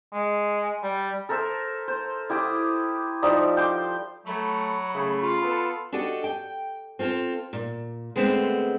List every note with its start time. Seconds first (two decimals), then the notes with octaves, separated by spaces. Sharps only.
0.13 G#3
0.84 G3
1.29 A4 A#4 C5 E5
1.88 C5
2.30 E4 G4 D6 D#6
3.22 F3 G3 D#4 E5
3.57 G5 C6 D6
4.26 F#3 A3 B5
4.94 C#3 A3
5.22 F4
5.42 B3 A4
5.92 D4 F#4 G4 A4 D#5
6.24 G5
6.99 C4 F4 A4
7.53 A#2
8.16 D3 G#3 A3 B3 C4